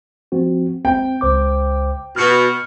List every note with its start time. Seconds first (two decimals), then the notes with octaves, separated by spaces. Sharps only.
0.32 F3 C4 F#4
0.85 C4 G5
1.21 C#2 C5 D6
2.16 B2 F6 C#7